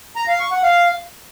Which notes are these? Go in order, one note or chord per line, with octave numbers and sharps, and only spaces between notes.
A#5
F5
C#6
F#5
F5